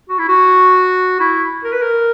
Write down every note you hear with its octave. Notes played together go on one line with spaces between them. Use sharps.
F#4
E4
F#4
E4
A#4
B4
A#4